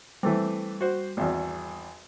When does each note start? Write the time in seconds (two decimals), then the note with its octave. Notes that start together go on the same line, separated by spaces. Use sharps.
0.23 E3 G3 A3 C4
0.81 F#4 C5
1.17 G#1 E2